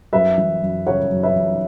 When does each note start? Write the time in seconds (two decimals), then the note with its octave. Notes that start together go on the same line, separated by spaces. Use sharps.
0.13 F#2 B4 E5
0.38 E3
0.62 F#2
0.87 C#3 C#5 F#5
1.11 F#2
1.23 B4 E5
1.36 E3